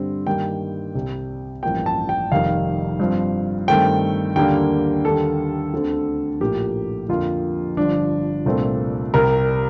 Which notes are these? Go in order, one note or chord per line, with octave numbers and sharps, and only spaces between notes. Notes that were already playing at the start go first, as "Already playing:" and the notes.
Already playing: G2 D3 G3 C4
G2 D#3 G3 A#3 G5
C2 C3 G3
A1 G2 F3 A#3 G5
A5
G5
F1 F2 D#3 G3 F5
G2 F3 C4
G2 D#3 A3 C4 G5
D#2 D3 G3 A#3 G5
D#2 D3 G3 A4
D2 D3 A3 C4
A#1 A2 F3 A#3 G4
F2 D3 F3 A#3 F4
G1 G2 F3 D4
C2 A#2 A3 C4
C2 C3 G3 A#4